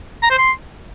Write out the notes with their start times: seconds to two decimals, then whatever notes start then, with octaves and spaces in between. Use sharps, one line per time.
0.22 A#5
0.30 C5
0.38 C6